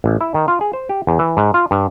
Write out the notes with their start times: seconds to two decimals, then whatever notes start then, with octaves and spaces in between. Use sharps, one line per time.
0.04 A1
0.21 E4
0.34 D#3
0.48 F4
0.61 G#4
0.73 C5
0.89 G4
1.07 E2
1.19 E3
1.37 G#2
1.54 F4
1.71 G2